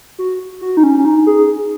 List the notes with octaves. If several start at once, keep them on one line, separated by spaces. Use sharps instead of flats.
F#4
F#4
D#4
C#4
C#4
D#4
G#4